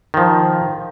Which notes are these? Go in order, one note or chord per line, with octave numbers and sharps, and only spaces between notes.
D#3 F3